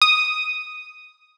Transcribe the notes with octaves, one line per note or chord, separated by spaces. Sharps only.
D#6